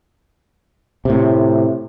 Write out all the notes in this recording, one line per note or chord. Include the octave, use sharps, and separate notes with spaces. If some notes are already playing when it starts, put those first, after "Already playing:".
A2 C3